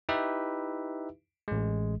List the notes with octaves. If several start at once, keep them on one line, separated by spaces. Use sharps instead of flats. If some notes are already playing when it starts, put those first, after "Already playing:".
D#4 E4 G4 B4 E5
A1 G#3